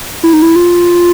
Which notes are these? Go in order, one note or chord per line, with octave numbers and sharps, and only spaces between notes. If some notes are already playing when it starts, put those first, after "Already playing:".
E4
D#4
E4
F4